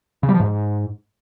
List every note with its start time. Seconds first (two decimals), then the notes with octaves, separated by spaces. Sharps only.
0.23 C#3
0.29 G3
0.34 F3
0.40 G#2